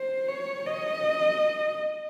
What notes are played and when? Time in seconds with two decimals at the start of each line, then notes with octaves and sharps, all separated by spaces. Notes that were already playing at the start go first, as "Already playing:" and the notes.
Already playing: C5
0.29 C#5
0.66 D#5